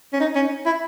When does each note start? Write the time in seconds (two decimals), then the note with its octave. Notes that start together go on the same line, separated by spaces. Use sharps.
0.13 C#4
0.20 D#4
0.35 C#4
0.66 E4